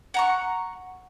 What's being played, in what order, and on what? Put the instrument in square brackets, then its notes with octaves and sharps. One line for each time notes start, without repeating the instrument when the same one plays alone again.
[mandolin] F#5 A#5 C#6